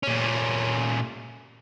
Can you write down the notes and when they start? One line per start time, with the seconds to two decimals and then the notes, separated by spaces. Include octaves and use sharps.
0.03 A#2 C#4